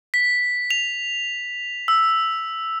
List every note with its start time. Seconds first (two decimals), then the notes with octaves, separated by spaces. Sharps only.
0.14 B6
0.71 F7
1.88 E6